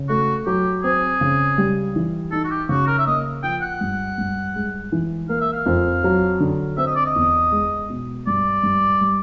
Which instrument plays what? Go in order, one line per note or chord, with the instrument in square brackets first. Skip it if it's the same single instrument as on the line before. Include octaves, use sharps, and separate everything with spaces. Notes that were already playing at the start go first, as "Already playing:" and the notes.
Already playing: [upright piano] C#3
[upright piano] A3 [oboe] F#4
[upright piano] F#3 [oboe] G4
[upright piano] C4 [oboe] G#4
[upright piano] C#3
G3
E3
[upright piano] D#4 [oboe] A4
[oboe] F#4
G4
[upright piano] C#3 [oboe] F#4
[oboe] A#4
E5
[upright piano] A#3 [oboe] D#5
[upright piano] F3 [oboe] G5
[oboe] F#5
[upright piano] G2
G2
G#3
E3
[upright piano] A#3 [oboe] F5
[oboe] E5
F5
[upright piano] F2
F#3
D3
[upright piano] C4 [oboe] E5
[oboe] D#5
D5
D#5
[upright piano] E2
G#3
B2
[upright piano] G2 [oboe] D5
[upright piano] G2
G3